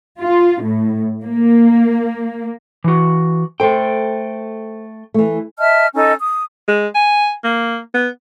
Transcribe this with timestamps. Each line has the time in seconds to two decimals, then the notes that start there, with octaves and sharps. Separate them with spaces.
0.20 F4
0.62 A2
1.24 A#3
2.84 E3 F#4
3.60 A3 A4 C5 G5
5.14 E3 A3
5.58 D#5 E5 A5 F6
5.95 C#4 D#4 A4 D#5
6.20 D#6
6.68 G#3
6.95 G#5
7.44 A#3
7.94 B3